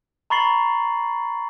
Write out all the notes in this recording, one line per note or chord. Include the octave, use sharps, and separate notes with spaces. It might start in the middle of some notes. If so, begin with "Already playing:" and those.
A#5 B5 C#6 A6 C7 F#7